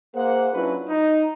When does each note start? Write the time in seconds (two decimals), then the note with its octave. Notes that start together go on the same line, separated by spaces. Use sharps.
0.15 A#3 G#4 C5 F#5
0.52 F#3 C#4 D4 E4 F4 B4
0.88 D#4